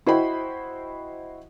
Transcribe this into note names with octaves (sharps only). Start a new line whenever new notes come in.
E4 F#4 C5 D#5 G5 B5